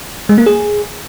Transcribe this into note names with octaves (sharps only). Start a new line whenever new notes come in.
G#3
A#3
G#4